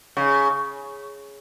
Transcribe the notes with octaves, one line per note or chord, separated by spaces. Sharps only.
C#3